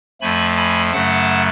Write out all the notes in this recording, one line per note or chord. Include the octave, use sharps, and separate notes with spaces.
F2 F3 A3 G#5 B5
G#5 B5
F#2 C#3 F#3 A3 F#5 A5